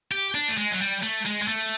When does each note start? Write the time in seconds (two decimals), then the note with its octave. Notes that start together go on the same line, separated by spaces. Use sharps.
0.11 G4
0.35 D4
0.49 A3
0.58 G#3
0.72 F#3
0.81 G3
1.03 A3
1.26 G#3
1.42 G#3
1.48 A3